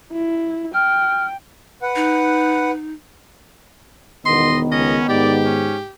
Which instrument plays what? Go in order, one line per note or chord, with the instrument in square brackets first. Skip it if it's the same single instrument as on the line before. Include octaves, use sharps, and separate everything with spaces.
[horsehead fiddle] E4
[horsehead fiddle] G5 [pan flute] F6
[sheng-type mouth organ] B4 F#5
[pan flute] D#4
[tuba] E1 [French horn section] D#3 B3 [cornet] D#5 [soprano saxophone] C6
[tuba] C#2 [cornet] C#4 [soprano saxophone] D#5
[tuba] G#2 [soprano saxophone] G4 [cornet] D5
[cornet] C#4